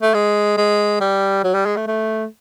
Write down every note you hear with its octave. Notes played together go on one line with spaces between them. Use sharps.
A3
G#3
G#3
G3
F#3
G3
G#3
A3
A3